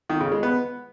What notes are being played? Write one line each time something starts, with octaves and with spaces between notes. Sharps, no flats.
D#3
C#3
G#3
B3